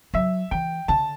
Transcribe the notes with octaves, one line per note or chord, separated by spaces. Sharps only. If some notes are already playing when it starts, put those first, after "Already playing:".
F#3 E5
E3 G5
D3 A5